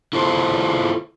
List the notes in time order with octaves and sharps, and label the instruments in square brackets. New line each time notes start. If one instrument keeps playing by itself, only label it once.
[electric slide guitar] E4 F4 A4 C5